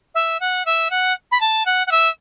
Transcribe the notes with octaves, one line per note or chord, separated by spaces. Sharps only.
E5
F#5
E5
F#5
B5
A5
F#5
F#5
E5